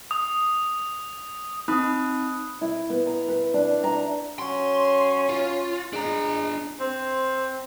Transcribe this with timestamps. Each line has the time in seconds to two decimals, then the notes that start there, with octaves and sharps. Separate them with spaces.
0.11 D#6
1.68 C4 D#4 B5 D#6 F#6
2.61 E4
2.90 B3
3.06 A#5
3.28 B4
3.54 D4
3.84 A#5
4.39 F#3 C#4 C6
5.29 F4
5.93 G#3 D4 A#5
6.80 C4